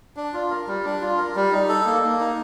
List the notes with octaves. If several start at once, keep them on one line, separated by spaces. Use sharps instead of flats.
D4
F4
A#4
G3
D4
F4
A#4
G3
D#4
A4
A#3
A#3
D#4